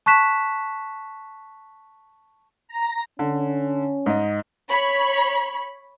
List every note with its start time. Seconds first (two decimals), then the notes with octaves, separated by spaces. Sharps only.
0.06 A5 C#6 F#6 B6 E7
2.68 A#5
3.19 D3 C#4
4.06 G#2 D#5
4.69 C#5 B5